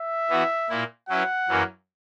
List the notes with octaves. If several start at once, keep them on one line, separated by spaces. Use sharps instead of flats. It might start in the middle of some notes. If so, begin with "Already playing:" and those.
Already playing: E5
E3 B3 F#4
A#2 A#3 E4
F#3 C#4 E4 B4 F#5
F#2 E3 A#3 C#4